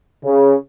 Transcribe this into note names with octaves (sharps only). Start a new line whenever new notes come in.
C#3